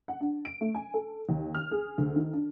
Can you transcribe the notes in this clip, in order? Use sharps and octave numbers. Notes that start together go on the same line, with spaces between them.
F#5
D4
D7
A3
G#5
A4
D#2
F6
G#4
D2
D#3
D4